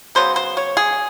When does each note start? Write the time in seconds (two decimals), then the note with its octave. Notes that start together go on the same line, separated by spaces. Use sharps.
0.15 C#3 F#3 B3 C5
0.36 C5
0.57 C#5
0.77 G#4